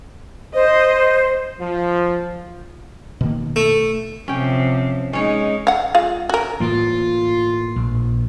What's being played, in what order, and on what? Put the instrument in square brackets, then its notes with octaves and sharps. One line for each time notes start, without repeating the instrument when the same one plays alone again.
[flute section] C5 [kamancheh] D#5
[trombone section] F3
[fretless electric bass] B2 D#3 A#3
[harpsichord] A3
[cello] C3 F3 [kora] C#4 G5
[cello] G#3 D#4 [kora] C#4 C#5
[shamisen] F5 F#5
G#3 F4 F5
F#4 A#4
[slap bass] A2 E3 A#3 [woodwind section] F4
[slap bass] A#1